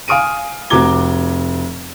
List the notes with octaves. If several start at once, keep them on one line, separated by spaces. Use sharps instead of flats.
F5 G#5 D#6 F6 D7 D#7
F1 F#4 A#5 D6 G#6 G7